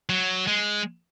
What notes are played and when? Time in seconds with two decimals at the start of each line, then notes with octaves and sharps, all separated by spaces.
0.09 F#3
0.47 G#3